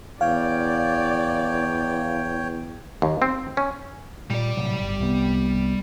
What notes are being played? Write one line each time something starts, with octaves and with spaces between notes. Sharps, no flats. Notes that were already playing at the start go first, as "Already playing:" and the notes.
E2 C#5 D5 F5 G5
D#2
C4
C#4
A#2 G3 D5
A2 C3 F#3
G1
C2 C3 B3